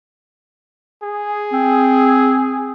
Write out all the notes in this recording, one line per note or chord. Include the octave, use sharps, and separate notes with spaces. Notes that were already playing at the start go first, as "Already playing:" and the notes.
G#4
C4